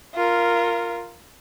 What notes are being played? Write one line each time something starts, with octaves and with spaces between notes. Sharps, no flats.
F4 A#4